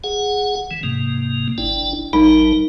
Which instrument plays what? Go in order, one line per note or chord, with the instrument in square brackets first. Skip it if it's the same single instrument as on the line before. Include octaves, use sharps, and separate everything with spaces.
[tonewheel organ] G#4 F#5
E3
G#2 C3 A#3
G1 D4 E4
[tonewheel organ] A1 G3 A#4 [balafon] D#4